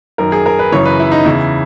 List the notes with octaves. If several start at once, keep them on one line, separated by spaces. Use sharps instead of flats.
F#2 D#3 A#4
G#4
A#4
B4
F#2 C#3 E3 C#5
B4
E4
D#4
E2 C#3 E3 E4